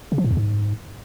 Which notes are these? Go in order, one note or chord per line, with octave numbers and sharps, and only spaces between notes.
C#3
F3
A2
E2
G#2